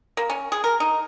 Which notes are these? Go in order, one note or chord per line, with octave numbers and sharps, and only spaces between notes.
A#3
C#4
G#4
A#4
D#4